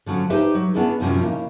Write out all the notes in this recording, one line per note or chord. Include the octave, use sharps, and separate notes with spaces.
D3 F3 F#3 C#4
D#4 G4 B4 C5 E5
F#3
B3 C#4 D4 E4 G#4 C5
F#2 A2 C3 F3 F#3 C#4
C#3 A#3 D#4 E4